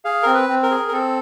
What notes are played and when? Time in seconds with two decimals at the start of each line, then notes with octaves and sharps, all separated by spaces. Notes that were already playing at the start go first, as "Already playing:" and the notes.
0.05 G#4 F5
0.23 C4 A#4
0.34 B4
0.49 C4
0.63 A#4
0.71 G#4
0.88 A#4
0.92 C4 A4